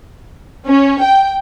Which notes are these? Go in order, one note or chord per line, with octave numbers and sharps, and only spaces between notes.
C#4
G5